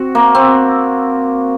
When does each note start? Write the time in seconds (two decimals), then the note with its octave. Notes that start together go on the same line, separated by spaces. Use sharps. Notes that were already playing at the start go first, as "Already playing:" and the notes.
Already playing: C4 F#4
0.15 A#3
0.35 C4